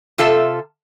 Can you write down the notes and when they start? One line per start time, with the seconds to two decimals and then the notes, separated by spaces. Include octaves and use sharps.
0.18 C3 F4 A4 E5 A5